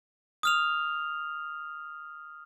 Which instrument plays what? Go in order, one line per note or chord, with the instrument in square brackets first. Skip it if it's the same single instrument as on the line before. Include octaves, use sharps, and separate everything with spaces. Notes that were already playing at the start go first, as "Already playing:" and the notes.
[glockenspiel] D#6 F6 F7